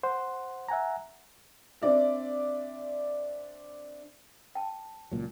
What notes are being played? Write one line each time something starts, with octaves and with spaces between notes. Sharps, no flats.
C5 F#5 C6
E5 F#5 G#5 A#5
C4 D4 D5 E5
G5 A5
C#2 A#2 F#3